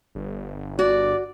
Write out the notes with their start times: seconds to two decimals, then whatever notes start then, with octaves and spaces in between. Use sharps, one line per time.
0.15 G1
0.79 F#4 D5